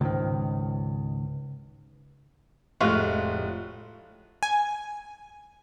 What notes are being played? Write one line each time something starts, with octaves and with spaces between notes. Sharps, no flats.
C#2 G#2 D#3
F1 A2 F3 G#3 F4 F#4 F5 F#6
G#5